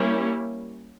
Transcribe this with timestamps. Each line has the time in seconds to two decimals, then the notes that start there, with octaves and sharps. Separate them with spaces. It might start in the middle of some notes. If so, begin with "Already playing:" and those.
Already playing: G3 A#3 C#4 E4